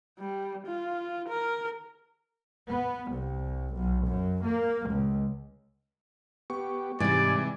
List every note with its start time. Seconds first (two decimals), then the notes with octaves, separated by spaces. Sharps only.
0.20 G3
0.67 F4
1.29 A#4
2.67 B3
3.10 C2
3.74 B1
4.06 F#2
4.43 A#3
4.89 C#2
6.50 B3 G4 C#6
7.00 G#2 C3 E3 G3 G#3 D5 G#5